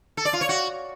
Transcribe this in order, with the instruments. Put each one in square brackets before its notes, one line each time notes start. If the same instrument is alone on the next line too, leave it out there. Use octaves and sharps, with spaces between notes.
[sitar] A4
D5
F4
C#5
F#4